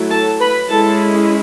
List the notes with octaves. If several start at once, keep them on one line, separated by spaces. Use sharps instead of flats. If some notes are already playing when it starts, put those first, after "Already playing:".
Already playing: F#3 A3 E4
A4 A5
B4 B5
G#3 C#4 E4 A4 A5